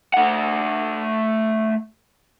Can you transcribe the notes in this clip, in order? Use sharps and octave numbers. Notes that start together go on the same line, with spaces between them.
A3 F#5